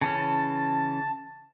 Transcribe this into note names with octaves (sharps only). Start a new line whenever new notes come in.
C#3 E3 C#4 A5